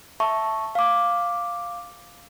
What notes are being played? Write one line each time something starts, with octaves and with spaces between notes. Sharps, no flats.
E5 A5 C#6
F5 D6